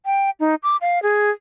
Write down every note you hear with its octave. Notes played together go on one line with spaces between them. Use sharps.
G5
D#4
D6
F5
G#4